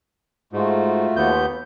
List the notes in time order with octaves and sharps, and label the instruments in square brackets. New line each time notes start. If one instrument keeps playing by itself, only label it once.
[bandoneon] G#2 [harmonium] A3 F4 F#4
[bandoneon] D#2 B3 G6